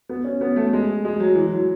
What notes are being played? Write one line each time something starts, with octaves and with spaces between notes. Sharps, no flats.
B3
C#4
B3
A3
G#3
G#3
F#3
E3
F#3